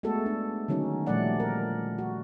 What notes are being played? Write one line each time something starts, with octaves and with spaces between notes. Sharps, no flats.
G#3 A3 B3 F#4 A4
D4
D3 D#3 F#3 C#4 D#4
A#2 F3 G3 A3 D5 F#5
A#4
F#4